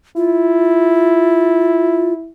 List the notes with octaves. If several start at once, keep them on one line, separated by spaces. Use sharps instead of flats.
E4 F4